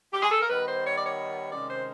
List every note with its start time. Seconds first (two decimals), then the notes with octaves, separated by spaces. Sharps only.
0.13 G4
0.23 G#4
0.31 A4
0.40 A#4
0.49 D#3 G3 B3 B4
0.67 C5
0.84 C#5
0.96 D5
1.06 C#5
1.51 C3 D#3 G#3 C#4 D5
1.69 C5